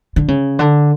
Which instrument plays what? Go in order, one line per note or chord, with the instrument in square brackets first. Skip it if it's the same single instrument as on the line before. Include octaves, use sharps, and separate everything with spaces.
[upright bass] D3
C#3
D3